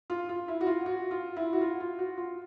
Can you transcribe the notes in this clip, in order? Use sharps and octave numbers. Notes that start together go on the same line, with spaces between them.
F4
F4
E4
F#4
F4
F#4
F4
E4
F#4
F4
F4
F#4
F4